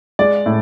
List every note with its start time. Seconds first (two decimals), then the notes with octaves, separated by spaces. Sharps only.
0.19 G#3 D5
0.46 A2